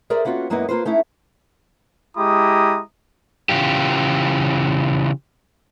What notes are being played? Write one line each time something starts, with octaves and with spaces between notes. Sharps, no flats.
G#4 A#4 C5 D5 E5
A#3 B3 C#4 F4 F#4
F#2 G#3 A#3 B3 E4 D#5
A#3 F4 B4 C5
A3 C#4 D#4 E4
G#3 E4 G4 A#5 D#6
C#3 E3 F4 G4